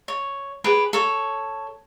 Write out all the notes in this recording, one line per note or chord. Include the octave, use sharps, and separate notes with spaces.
C#5
G4 G#4 B4
A4 C#5